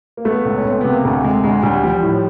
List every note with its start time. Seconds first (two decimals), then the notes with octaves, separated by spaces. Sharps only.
0.17 A#3
0.25 A3 B3
0.45 C#2
0.58 C#4
0.64 C#2
0.69 C4
0.81 C3 B3
0.92 A#3
1.04 D2 A3
1.24 C3 G#3
1.44 D2 G#3
1.63 D2 G3
1.83 F3 G3
2.03 A2